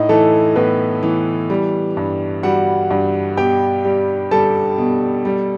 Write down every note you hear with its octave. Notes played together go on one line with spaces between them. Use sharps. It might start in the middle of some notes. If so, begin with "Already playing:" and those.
Already playing: A2 D#4 D#5
E3 A3 A4
A2 B3 B4
E3
G3
G2
G3 F#4 F#5
G2
B2 G4 G5
G3
G3 A4 A5
B2
G3